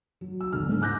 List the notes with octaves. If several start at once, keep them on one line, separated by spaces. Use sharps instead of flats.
F#3
E6
E1 D3 F6
G#2
D6 F#6 G6 A#6